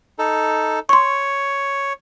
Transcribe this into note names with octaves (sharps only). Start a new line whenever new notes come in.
D#4 A4
C#5 C6 C#6